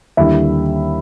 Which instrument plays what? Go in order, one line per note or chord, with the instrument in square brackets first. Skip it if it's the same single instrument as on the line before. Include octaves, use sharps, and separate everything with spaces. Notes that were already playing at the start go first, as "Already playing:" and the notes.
[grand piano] D#2 D3 G3 E4 E5